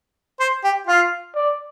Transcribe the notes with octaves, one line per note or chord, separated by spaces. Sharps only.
C5
G4
F4 F5
D5